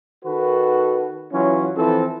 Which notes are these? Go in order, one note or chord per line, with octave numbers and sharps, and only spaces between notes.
D#3 F#4 A4 B4
E3 F#3 C#4 F4
E3 F3 C4 A4